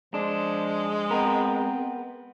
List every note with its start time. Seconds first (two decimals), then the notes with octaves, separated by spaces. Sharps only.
0.14 F3 G#3 D4
1.11 B3 C4 A#4